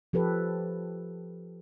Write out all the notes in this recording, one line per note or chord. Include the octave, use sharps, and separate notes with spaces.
F3 G4 A4 B4